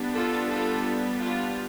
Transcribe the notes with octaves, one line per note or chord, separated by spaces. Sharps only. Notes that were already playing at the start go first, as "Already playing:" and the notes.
Already playing: G3 B3 D4
F4 A4
F4 A4
D4 F4